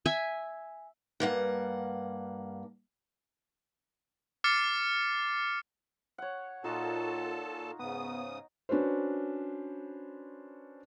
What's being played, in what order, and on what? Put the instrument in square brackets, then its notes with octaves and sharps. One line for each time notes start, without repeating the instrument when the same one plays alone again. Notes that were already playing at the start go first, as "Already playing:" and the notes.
[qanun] E5 G#5
[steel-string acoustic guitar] G2 A#3 F#5
[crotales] D6 F6 A6 C7 C#7
[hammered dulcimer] C#5 F#5
[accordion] A#2 A4 A5 [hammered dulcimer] D#4 F#4 [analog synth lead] F4
[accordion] G#2 C#3 D#6 [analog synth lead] B3
[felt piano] C#4 D4 F#4 B4 C5